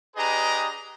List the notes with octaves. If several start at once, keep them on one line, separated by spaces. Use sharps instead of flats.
D4 G4 G#4 B4 D#5 A#5